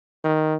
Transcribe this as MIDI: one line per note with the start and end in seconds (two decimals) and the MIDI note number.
0.24 0.56 51